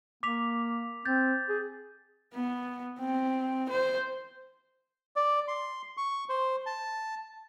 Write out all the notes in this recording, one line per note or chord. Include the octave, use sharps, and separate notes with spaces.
A#3 D6 B6 F7
C4 G6 A6
G#4
B3
C4
C5
D5
C6
C#6
C5
A5